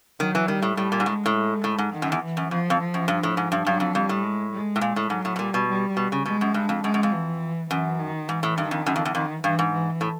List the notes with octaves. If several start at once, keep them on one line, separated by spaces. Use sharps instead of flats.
D#3 F#3
E3
D#3 G3
A2
A2 G3
A#2
G#2
A2 G#3
A2
A2
G#2
D#3
F#2
E2
E3
F#2
F2 F3
F2
F3
F#2
G2
A2
G#2
G2
G2 F#3
F2
F2 G3
A2
G#3
G#3
A2
A#2
A2
G#2 F#3
A2
B2
A#2 G3
B2
G3
B2
C#3
B2 G#3
F#2
G2
F2
F#2 G#3
F#2
F2
E3
F#2 E3
D#3
G#2 E3
A2
G2 D#3
F2
F#2
F2
E2
F2 D#3
G2 E3
G#2
E3
A2